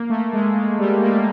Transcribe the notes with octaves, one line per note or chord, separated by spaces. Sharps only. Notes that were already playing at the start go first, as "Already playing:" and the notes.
Already playing: A#3
A3
G#3
G#3
G3
A#3